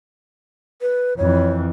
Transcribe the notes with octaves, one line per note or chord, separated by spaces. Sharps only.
B4
F2 E3 C#5